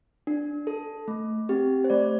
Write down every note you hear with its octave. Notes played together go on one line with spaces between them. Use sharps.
D4
A4
A3
C4 G4
C5
A3 D5